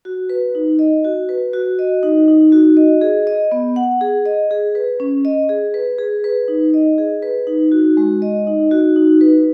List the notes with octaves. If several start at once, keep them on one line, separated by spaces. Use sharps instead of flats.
F#4
B4
D#4
D#5
F#4
B4
F#4
D#5
D#4
D#4
F#4
D#5
G#4
D#5
B3
F#5
G#4
D#5
G#4
B4
C#4
D#5
G#4
B4
G#4
B4
D#4
D#5
G#4
B4
D#4
F#4
G#3
D#5
D#4
F#4
D#4
B4